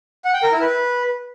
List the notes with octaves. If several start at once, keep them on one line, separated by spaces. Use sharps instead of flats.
F#5
G5
A#4
E4
B4